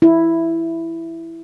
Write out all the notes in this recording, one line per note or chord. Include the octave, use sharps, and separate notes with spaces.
E4